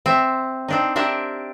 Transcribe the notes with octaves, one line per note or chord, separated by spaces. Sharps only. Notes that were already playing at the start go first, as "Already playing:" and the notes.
C4 E5
C4 D4 D#4
C4 D4 G4 A#4 E5